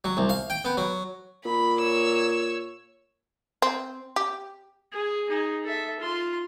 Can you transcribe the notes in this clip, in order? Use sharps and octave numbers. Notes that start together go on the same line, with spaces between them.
F#3
C2
F5
G5
B3
F#3
A#2 B5
C#5 E6
C4
G4
G#4
D#4 G#4
A4 E5
F4 C6